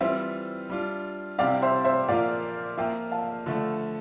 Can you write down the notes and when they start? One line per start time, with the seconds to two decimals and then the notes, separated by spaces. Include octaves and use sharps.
0.01 E3 G3 C4 F4 C5 E5
0.70 G3 D4 F4
1.39 C3 G3 C4 E4 G4 D5 F5
1.62 C5 E5
1.84 C5 E5
2.08 A#2 F3 A#3 F4 D5 F5
2.77 F3 A#3 F4 E5 G5
3.11 F5 A5
3.46 D3 F3 A3